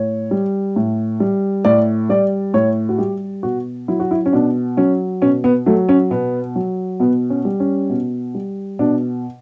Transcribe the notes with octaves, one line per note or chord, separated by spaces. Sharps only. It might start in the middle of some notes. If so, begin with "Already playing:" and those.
Already playing: A2 C#5
G3
A2
G3
A2 D5
G3 D5
A2 C#5
F#4
G3 G4
B2 F#4
F#3 E4
F#4
E4
C#4
B2 D4
F#3 C#4
B2 C#4
B3
F#3 A3
C#4
B2 B3
F#3
B2 B3
C#4
G3
C#4
B2
G3
B2 D4